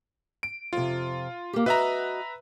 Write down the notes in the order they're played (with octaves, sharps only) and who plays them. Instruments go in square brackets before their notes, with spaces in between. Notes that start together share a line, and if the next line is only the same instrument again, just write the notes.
[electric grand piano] D7
[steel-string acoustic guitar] F2 C3 [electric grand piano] F4
[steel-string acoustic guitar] A#3 G4
[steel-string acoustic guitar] F#4 D#5 [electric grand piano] B4 E5 A#5